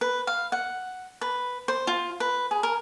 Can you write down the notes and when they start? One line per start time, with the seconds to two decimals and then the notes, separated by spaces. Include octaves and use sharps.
0.01 B4
0.27 F5
0.52 F#5
1.21 B4
1.68 C5
1.87 F4
2.20 B4
2.51 G#4
2.63 A#4